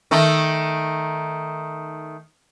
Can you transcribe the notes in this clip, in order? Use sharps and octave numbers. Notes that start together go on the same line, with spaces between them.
D#3 A3